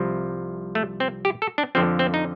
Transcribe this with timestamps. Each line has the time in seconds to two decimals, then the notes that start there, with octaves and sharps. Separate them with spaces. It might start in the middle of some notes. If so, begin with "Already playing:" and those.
Already playing: C2 C3 F3
0.75 A3
1.00 C4
1.25 G4
1.42 A4
1.58 D4
1.75 F2 D3 F3 C4
1.99 C4
2.14 D#4